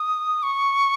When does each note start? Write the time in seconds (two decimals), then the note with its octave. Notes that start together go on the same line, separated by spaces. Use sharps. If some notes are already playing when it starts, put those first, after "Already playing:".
Already playing: D#6
0.43 C#6